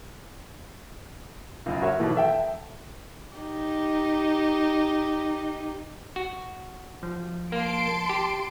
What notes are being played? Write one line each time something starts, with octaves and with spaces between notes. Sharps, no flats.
C#2 F#2 C#3
F#4 A#4 C#5 E5
B2 D#3 E3 F#3 A3
A4 E5 G5
D#4 G4
F#4
F3
A#3 A5 C6 D7
G4